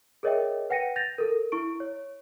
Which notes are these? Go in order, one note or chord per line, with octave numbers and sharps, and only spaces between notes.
G#4 A#4 C#5 D#5 E5 G5
B4 F#5 G5 A#6 C#7 D#7
G6 A6 A#6 F7
A4 A#4
E4 C#6 D7
C#5